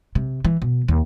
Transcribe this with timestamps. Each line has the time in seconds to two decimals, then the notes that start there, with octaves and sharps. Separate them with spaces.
0.15 C3
0.45 E3
0.62 B2
0.88 D#2